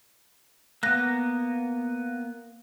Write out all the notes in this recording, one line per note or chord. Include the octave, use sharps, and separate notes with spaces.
A#3 B3 F#6 A#6